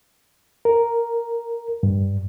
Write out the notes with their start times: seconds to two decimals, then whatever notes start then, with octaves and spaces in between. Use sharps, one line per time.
0.65 A#4
1.83 G2